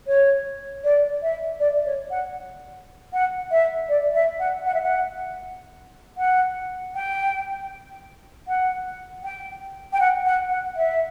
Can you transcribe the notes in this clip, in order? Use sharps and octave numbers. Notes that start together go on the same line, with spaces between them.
C#5
D5
E5
D5
C#5
F#5
F#5
E5
D5
E5
F#5
F#5
E5
F#5
F#5
G5
F#5
G5
G5
F#5
F#5
F#5
E5